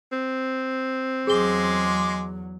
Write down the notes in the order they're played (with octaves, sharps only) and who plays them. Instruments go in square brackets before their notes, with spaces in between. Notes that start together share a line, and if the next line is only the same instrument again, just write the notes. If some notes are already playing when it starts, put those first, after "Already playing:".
[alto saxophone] C4
[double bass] E2 F#3 [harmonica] G#3 C6 D6 [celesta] G#4 G7